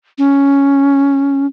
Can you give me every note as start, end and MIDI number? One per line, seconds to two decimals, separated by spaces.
0.18 1.46 61